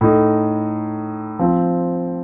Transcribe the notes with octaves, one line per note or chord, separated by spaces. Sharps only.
A2 A3 D#4
F3 C4 F4